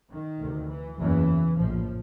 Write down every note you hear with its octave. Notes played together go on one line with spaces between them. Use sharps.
D#3
D2 C3
E3
F#1 E2 C#3 E3
A#1 A2 F3